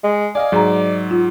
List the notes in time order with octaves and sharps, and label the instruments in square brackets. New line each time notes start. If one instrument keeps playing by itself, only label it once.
[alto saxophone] G#3
[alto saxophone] D5 [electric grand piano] D#5 F5 G#5
[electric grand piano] G#2 F#3 [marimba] G#4 A#5
[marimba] F4